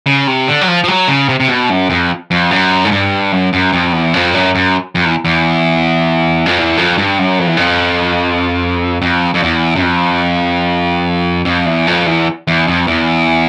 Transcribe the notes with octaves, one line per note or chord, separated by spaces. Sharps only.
C#3
C3
D3
F#3
F3
F3
F#3
C#3
C3
C3
B2
F#2
F2
F2
F#2
G#2
G2
F#2
F#2
F2
E2
F2
F#2
F#2
F2
E2
E2
F2
E2
F2
G2
F#2
F2
E2
F2
F2
F2
E2
F#2
F2
F2
E2
F2
E2
E2
F2
E2